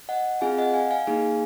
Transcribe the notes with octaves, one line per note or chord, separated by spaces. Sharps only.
D#5 F#5
C4 F4 G#4 F5 G#5
D#5 F#5
F5 G#5
F5 G#5
A#3 D#4 G#4